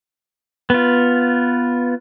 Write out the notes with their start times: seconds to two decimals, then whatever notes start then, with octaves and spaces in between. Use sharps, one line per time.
0.70 B3 F4